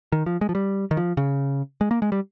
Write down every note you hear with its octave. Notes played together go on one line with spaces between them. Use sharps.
D#3
F3
G#3
F3
G3
D#3
F3
C#3
G#3
A#3
G#3
G3